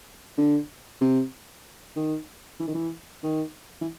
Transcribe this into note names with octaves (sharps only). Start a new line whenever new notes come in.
D3
C3
D#3
E3
D#3
E3
D#3
E3